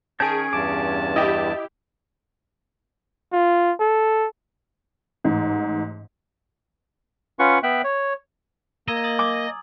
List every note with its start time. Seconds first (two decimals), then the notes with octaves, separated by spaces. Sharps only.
0.20 D#3 C#4 G#4 C#5 A5 G6 D7
0.53 E2 G2 A5 D6
1.16 E4 G4 D#5
3.32 F4
3.80 A4
5.24 A1 G#2
7.39 C#4 F4 B4 F#5 C#6
7.63 B3 E5 G5 F#6
7.84 C#5
8.88 A#3 D#5 A#5 E6 G#6
9.04 D#6 A6 F#7
9.19 G#5 D6 D#6